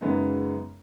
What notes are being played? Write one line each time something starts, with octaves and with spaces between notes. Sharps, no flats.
F#2 C#3 G#3 B3 D#4